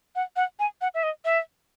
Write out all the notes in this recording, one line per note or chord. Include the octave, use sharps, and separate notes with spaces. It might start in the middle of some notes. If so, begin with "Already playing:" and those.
F#5
F#5
G#5
F#5
E5
D#5
E5